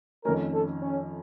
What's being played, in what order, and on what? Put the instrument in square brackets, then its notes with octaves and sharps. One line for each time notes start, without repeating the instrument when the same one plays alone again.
[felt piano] F2 D#3 A3 C#4 [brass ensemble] A#4
[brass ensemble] A4
C#4